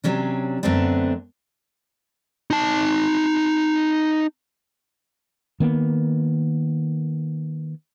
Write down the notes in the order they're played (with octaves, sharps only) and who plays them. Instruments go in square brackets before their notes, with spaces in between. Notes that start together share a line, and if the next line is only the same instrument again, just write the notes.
[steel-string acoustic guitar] C3 F#3 C#4 D4
F#2 D3 A3 B3 C4 D4
[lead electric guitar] D#4 A5
[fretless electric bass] D#3 A#3 B3